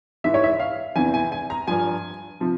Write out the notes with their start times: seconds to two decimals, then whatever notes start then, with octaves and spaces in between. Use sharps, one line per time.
0.24 G#2 E3 E5
0.34 C#5
0.44 E5
0.60 F5
0.96 E2 C3 E3 G#5
1.14 G#5
1.32 G#5
1.50 A#5
1.67 G2 F3 G#5
2.40 C3 F3